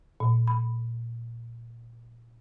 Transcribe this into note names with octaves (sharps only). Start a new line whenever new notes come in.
A#2
B5